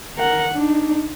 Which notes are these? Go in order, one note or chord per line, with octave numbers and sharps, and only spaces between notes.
A#4 F#5
D4 D#4